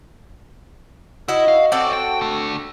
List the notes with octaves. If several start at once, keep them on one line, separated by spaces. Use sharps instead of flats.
E4 F#4 D#5
F5
C4 F#4 A4 C#5 D5
G5
D3 A3